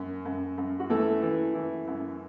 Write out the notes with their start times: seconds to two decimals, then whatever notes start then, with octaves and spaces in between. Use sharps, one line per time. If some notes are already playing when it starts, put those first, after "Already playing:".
Already playing: F#2
0.25 F#2
0.58 F#2
0.80 F#4
0.90 E3 A3 A4
1.23 E3
1.55 E3
1.88 F#2